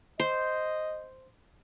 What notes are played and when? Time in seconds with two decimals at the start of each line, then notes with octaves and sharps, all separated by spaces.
0.20 C5 D#5